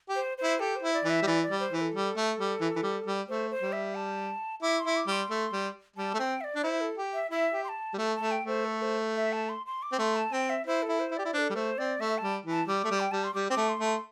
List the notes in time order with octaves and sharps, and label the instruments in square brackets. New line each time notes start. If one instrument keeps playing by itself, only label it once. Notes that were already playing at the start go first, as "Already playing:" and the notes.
[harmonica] G4
[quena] C5
C5
[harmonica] E4
[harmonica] G4 [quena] A4
[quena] C5
[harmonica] E4
[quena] D5
[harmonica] E3
[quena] E5
[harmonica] G3
[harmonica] E3 [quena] D5
[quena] D5
[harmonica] G3
[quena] C5
[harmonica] E3
[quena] C5
A4
[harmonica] G3
A3
G3
E3
E3
G3
G3
[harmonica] A3 [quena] C5
[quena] C5
[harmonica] G3
[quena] E5
A5
[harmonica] E4 [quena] D6
[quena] C6
[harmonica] E4
[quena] D6
[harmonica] G3
[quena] C6
[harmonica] A3
G3
[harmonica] G3 [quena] A5
[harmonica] A3
[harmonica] C4 [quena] G5
[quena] E5
D5
[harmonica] D4
[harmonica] E4 [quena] C5
[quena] A4
[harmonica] G4
[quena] E5
[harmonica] E4 [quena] E5
[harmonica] G4
[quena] C6
A5
[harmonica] G3
[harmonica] A3 [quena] A5
[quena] A5
[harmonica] A3
[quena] G5
[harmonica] A3 [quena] C5
[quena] A4
C5
E5
A5
C6
C6
D6
[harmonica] C4
[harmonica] A3 [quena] C6
[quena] A5
[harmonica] C4 [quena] G5
[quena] E5
[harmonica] E4 [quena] C5
[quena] A4
[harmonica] E4
[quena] C5
[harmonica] E4
[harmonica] G4 [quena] D5
[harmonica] E4
[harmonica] D4 [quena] C5
[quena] A4
[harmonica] G3
[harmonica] A3 [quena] C5
[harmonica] C4 [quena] D5
[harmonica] A3 [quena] E5
[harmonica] G3 [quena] A5
[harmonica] E3
[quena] A5
[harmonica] G3 [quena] D6
[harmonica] A3
G3
[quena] G5
[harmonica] G3 [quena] A5
[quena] C6
[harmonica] G3 [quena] D6
[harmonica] C4 [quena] D6
[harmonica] A3
[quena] C6
[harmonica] A3
[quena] C6